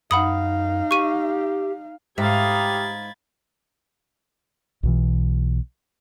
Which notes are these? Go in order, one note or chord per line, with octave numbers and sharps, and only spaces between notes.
F#2 D#4 F5 F#5 B5 D#6
G4 C#6 D#7
G#2 D#4 G4 E5 F5 B5 G#6 A6
B1 B2 E3